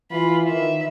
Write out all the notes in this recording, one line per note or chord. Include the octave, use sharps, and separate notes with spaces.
E3 F4 B5
D#3 E5